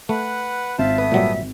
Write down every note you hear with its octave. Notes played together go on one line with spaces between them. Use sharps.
A3 B4 F#5
G#1 F4 C5 E5 A5
A3 B3 B4 D#6
A#2 F#3 G3